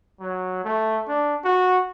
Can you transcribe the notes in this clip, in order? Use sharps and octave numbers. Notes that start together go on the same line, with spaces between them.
F#3
A3
D4
F#4